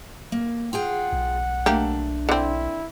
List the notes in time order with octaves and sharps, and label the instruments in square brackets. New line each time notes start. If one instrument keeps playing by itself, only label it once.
[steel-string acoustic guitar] A#3
[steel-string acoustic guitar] F4 G#4 G5 [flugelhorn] F#5
[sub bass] B1
[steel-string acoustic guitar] A3 D4 [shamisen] A#3 G4
[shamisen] D3 C4 [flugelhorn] E4